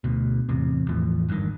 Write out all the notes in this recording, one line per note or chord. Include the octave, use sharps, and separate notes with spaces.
D2 B2
A1 E2 C3
E2 A2 E3 F3
G#1 G2 D3 D#3